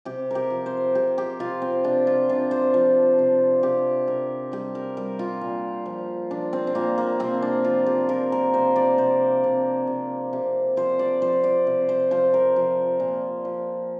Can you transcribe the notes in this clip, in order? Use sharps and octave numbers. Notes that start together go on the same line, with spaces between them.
C3 G4
G4 A#4
F3
C5
C3 G4
G4
C3 F4
C4
C3 D4
F4
C3 D4
C5
F3
C3
C3 G4
C3 A#4
G3 G4
A#4
G3 A#4
F4
A#2
F3
F3 D4
C4
C4
A#2 A#3
A#3
C3 C4
D4
F3 F4
G4
F3 A#4
A#4
C3 C5
D5
C3 C5
C3
C3
C3
F3 C5
D5
F3 C5
D5
C3
C5
F3 C5
A#4
F3
A#2
F3